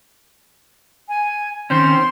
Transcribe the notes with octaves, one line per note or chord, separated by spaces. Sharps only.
G#5
D#3 C4 C#4 C6